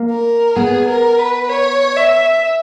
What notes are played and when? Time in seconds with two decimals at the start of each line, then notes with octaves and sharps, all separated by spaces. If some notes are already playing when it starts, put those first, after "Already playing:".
Already playing: A#3
0.10 A#4
0.56 B3 G#4
0.88 A#4
1.18 B4
1.49 C#5
1.96 E5